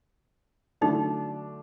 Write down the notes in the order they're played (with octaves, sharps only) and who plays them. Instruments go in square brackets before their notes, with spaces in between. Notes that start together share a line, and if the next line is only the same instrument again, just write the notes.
[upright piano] D3 F#3 A3 D4 [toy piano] D#4